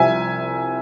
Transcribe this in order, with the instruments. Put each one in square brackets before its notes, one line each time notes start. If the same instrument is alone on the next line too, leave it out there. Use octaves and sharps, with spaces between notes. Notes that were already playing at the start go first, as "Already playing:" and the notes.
Already playing: [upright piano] C2 C3 F3 E5 G#5